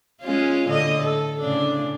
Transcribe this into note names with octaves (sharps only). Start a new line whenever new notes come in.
G#3 C#4 F4
A2 D3 D#5
A4
A2 C#3 D4